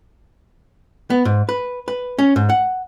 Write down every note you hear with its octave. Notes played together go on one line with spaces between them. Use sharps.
B3
G#2
B4
B4
C#4
G#2
F#5